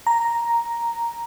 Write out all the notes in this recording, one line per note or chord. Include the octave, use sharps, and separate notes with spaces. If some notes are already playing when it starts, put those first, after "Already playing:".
A#5